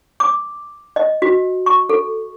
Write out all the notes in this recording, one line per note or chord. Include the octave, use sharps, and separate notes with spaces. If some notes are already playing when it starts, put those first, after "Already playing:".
D6
D#5
F#4
C#6
A4